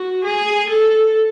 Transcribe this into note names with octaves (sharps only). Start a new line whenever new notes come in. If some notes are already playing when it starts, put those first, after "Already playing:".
Already playing: F#4
G#4
A4